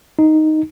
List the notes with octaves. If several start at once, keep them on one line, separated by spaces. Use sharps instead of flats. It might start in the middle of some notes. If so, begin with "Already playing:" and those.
D#4